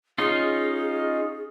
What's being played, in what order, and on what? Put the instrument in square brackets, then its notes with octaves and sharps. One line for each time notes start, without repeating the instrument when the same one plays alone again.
[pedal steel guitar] C#4 D#4 F4 [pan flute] G#4